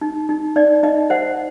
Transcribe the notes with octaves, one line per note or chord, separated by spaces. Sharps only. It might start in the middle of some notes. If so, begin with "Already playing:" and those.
D#4
D#4
D#4 D5
D#4 D#5
C5 F#5